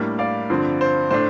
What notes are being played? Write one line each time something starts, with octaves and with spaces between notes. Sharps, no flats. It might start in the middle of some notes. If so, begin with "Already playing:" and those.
Already playing: A2 G3 A#3 D4
D5 F5
G2 D3 F3 C4
C5
A2 A3 D4 C5